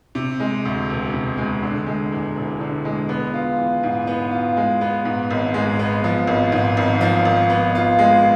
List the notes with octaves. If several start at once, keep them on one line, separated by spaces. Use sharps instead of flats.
C3
G#3
D2
E1
C3
G#3
D3
G#3
E2
E1
D3
G#3
B3
F4
E3
G#2
B3
F4
G#3
B3
G#2
G#1
G#3
B3
F3
G#1
G#2
G#1
F3
G#1
B3
F4
G#3